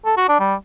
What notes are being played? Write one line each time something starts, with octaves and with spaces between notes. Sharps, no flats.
A4
F#4
D4
G3